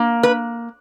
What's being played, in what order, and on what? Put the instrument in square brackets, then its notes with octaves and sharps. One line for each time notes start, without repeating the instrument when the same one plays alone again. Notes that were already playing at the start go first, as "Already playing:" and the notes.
Already playing: [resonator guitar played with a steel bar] A#3
B4